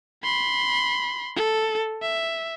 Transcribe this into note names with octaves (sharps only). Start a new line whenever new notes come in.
B5 C6
A4
E5